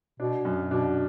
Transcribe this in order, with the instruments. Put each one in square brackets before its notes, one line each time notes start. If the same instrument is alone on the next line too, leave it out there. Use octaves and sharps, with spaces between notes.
[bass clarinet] B2 [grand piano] D4
[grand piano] F#2
[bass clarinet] B2 [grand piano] D4